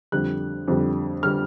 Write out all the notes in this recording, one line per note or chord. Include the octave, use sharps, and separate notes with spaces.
F2 D3 G3 F#6
F2 D3 G3
D3 G3 F6